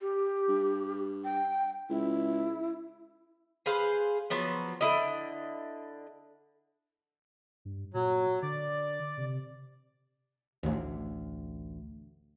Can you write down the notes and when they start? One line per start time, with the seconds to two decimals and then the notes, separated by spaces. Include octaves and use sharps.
0.01 G4
0.48 G2
1.24 G5
1.89 C#2 E4
3.66 G#4 B4 C5 F5
4.30 F3 F#3 B3
4.81 D3 E4 D#5
7.65 G2
7.94 A#2 F#3
8.42 D3 D5
9.17 C3
10.63 A1 D2